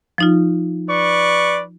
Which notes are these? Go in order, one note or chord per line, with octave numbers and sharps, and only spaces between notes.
F3 D#4 F4
B4 D5 C#6